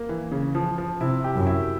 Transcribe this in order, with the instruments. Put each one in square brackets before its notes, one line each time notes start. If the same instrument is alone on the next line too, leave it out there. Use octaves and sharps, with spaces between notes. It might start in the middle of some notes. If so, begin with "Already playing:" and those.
Already playing: [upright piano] A#3
E3
C#3
F3
F3
[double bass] C3 [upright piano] E4
[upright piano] G4
[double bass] F#2
[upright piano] E4